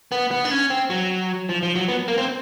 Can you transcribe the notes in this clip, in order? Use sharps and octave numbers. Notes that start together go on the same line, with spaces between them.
B3
B3
D4
C#4
C4
F#3
F3
F3
F#3
B3
A#3
C4